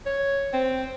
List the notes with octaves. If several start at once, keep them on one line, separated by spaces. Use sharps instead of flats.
C#5
C4